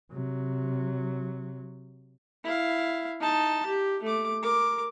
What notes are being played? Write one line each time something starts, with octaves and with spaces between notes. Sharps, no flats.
C3 F#3
E4 F5
D#4 A5
G4
A3 D6
A#4 D6